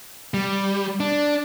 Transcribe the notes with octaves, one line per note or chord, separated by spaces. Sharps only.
G3
D4